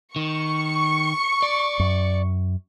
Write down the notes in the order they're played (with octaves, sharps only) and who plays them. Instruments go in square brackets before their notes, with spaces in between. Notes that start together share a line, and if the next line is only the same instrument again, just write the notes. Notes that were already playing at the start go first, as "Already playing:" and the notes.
[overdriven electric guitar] D#3 [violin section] C#6
[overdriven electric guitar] D5
[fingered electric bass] F#2